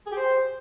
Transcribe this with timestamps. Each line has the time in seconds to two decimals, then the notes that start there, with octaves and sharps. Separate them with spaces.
0.06 G#4
0.11 G4
0.17 C5